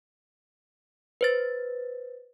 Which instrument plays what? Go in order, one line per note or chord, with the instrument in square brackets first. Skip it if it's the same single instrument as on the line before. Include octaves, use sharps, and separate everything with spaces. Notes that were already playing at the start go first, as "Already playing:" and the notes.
[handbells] B4 C5 A6